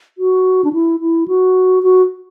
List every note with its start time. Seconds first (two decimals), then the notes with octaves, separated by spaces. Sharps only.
0.18 F#4
0.64 D4
0.73 E4
1.00 E4
1.28 F#4
1.83 F#4